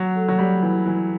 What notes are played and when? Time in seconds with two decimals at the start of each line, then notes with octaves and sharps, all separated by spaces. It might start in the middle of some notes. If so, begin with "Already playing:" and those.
Already playing: F#3
0.15 A3
0.28 F#3
0.39 G3
0.62 E3
0.85 E3